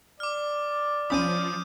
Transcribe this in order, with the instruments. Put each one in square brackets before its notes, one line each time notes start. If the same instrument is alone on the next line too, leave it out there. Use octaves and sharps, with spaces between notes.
[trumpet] D5 [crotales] D6 F6
[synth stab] C2 C#4 B5 [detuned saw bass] F3 [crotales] D#6 G6 D#7